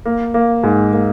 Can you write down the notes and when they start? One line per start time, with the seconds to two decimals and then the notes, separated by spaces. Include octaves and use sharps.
0.05 A#3
0.34 A#3
0.63 G#2
0.93 A#3